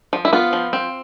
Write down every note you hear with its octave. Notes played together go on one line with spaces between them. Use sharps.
F3
E4
B3 F4
F3
C4